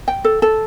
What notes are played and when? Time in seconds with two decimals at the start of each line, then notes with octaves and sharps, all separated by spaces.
0.08 G5
0.24 A4
0.42 A4